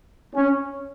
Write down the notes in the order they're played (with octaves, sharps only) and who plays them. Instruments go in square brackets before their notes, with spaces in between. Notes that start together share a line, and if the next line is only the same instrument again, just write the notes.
[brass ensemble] C#4